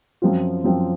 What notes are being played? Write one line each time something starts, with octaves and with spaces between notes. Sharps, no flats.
F#2 F3 C4 F4
F#2 F3 C4 F4